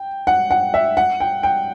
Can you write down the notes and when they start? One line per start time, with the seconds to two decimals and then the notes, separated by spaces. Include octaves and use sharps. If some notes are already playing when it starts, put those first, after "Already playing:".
Already playing: G5
0.27 F#5
0.51 F#5
0.74 E5
0.97 F#5
1.20 G5
1.43 G5